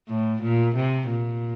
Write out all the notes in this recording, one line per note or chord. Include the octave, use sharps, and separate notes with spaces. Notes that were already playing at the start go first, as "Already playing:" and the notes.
A2
A#2
C3
A#2